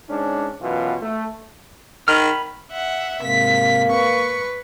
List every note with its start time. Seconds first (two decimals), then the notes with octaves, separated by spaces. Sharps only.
0.10 G#2 C#4 D4
0.62 F#2 B2 E3 F4
1.02 A3
2.08 D#3 B5 F6
2.71 E5 F#5
3.22 G#2 C3 A#3 B6
3.90 B4 C#6